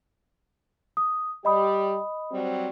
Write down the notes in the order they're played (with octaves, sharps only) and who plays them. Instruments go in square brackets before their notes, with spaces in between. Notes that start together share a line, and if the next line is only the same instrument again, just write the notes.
[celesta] D#6
[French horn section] G3 G4 [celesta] D#5 B5 D#6
[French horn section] F#3 G3 C4